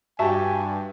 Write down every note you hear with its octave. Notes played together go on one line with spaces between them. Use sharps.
G2 F#4 G4 E5 G#5 A5